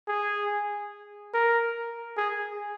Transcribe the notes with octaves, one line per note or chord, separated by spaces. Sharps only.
G#4
A#4
G#4